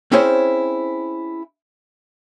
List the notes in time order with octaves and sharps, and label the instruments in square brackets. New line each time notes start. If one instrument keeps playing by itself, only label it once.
[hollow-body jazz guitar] C4 C#4 E4 G#4 C5 C#5